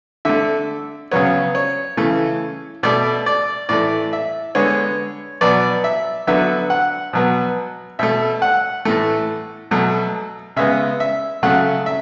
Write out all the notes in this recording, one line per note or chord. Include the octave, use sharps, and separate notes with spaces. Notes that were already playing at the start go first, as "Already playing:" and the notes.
D3 A3 E5
C#3 F#3 B3 C#5
C#5
C#3 E3 A3
B2 A3 D5
D5
A2 E3 A3 D5
E5
D3 G#3 B3 C#5
B2 F#3 B3 D5
E5
D3 F#3 B3 E5
F#5
B2 F#3 B3
B2 A3 E5
F#5
A2 E3 A3
B2 F#3 A3
C#3 G#3 B3 E5
E5
C#3 F#3 A3 F#5
E5